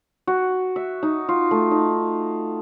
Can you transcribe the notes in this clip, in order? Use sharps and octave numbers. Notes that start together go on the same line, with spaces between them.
F#4
E5
D#4
F4
A3
D#4